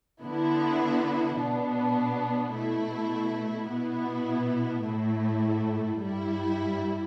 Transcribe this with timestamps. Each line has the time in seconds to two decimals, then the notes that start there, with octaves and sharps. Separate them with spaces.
0.22 D3 B3 E4
1.38 B2 B3 D4
2.54 B2 A3 E4
3.69 B2 B3 E4
4.85 A2 A3 E4
6.00 G2 G3 E4